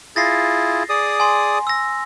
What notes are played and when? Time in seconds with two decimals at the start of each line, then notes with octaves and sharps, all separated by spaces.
0.16 E4 F4 G#4 A6 A#6 C7
0.89 G#4 D5 D#6
1.20 G#5 C6
1.67 E6 A#6